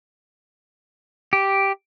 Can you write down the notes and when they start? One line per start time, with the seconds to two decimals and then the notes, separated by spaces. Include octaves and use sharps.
1.33 G4